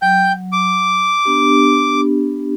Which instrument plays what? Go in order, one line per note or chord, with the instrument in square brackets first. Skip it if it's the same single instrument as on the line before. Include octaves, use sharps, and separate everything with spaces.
[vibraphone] F#3 [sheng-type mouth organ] G5 G6
[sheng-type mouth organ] D6
[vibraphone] B3 D4 G4